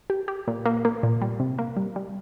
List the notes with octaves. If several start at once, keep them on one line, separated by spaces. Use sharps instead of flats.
G4
G4
A#2
A#3
A#3
A#2
G3
C3
A#3
G3
G3